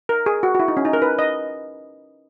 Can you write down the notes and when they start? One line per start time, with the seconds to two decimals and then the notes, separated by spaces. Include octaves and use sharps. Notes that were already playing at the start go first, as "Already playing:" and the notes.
0.09 A#4
0.26 G#4
0.43 F#4
0.55 F#4
0.60 E4
0.68 D#4
0.77 C#4
0.85 D#4
0.93 A#4
1.02 B4
1.19 D#5